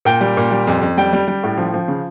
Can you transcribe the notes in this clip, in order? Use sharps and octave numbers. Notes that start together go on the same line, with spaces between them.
A#2 G5
G3
A#2
G3
F2
F2
G3 G5
G3
G3
A2
F3
F3
C#3